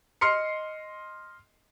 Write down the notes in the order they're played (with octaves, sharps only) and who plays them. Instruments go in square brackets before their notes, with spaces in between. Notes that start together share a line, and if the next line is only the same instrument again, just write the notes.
[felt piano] D#5 C6 F6 C7 C#7